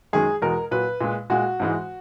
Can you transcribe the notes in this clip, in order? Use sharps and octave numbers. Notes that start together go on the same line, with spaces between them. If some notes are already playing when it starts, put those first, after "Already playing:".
F#2 D#3 G#3 G#4
E2 B2 G#3 A#4
A#2 F#3 B4
A#2 G#3
A#2 G#3 F#4
G#2 E3 G#3